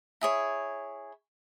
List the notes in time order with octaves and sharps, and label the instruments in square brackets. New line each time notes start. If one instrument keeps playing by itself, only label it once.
[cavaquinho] E4 G#4 C#5